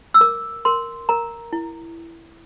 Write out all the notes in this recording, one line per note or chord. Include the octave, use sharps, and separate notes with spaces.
E6
A#4 D6
A#4 C6
A#4 A#5
E4